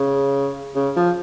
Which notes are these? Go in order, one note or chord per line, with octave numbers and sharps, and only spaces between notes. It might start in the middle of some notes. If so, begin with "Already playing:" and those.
Already playing: C#3
C#3
F3